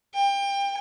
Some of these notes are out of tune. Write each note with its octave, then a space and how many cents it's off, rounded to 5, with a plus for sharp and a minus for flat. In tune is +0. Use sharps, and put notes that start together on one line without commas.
G5 +25